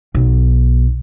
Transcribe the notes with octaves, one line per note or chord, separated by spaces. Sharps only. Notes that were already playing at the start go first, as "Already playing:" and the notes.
B1